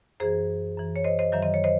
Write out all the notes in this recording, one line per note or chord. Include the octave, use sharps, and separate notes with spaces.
F#2 E3 G#4 C5
F#2 E3
C#5
C5 D#5
C5 D#5
F#2 D#3 F#3 E5
D#5
C#5
C5 D#5